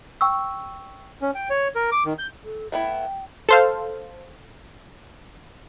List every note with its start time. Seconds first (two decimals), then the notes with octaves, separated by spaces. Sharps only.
0.21 G5 C#6 E6
1.22 C#4
1.35 G5
1.50 C#5
1.75 A#4
1.92 D6
2.05 D#3
2.19 G6
2.44 A4
2.72 A3 B3 E4 G5
3.49 A4 C5 F5